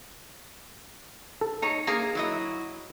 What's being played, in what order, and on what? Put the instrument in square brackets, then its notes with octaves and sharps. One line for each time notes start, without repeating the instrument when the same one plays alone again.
[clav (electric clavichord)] A4
[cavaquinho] D#4 C#5 A#5
[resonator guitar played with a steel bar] A#3 G#4 A#4 [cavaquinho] A#5
[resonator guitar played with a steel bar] F#3 E4 D#5